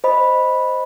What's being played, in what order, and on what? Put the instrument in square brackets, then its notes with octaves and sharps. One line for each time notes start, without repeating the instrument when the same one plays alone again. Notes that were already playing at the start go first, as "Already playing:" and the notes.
[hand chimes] C5 D#5 B5